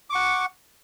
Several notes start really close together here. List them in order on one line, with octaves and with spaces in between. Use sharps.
D6 C#6 F#5